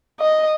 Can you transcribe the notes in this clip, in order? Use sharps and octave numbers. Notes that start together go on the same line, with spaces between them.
D#5